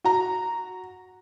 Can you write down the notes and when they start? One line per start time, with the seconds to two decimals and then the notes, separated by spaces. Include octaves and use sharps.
0.04 F#4 A#5